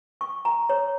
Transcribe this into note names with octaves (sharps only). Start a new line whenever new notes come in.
C#6
A#5
C#5